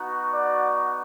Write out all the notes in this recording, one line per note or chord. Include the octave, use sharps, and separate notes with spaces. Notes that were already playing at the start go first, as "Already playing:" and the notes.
Already playing: B3 D#4 F#4
D5